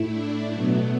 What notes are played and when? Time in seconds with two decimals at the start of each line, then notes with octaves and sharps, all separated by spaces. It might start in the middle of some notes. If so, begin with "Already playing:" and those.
Already playing: A2 A3 E4
0.09 D4
0.51 B2 F#3 A3 B3